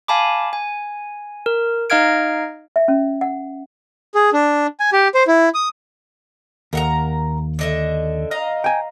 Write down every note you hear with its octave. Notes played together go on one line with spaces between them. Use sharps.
F5 G#5 A5 B5 D6
G#5
A#4
D#4 D#5 F5 F6 G#6 D7
E5
C#4
F#5
G#4
D4
G#5
G4
C5
E4
D#6
D#2 A#4 F#5 A#5
D3 D#5 E5
D#5 F5 A#5
G5 G#5